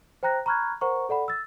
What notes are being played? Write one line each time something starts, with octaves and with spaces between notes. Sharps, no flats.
C5 G5 A#5 F#6 A#6
A#5 B5 C#6 F6 F#6 G#6
A#4 C5 F#5 A#5 C#6
A4 D5 F#5 B5
E6 A6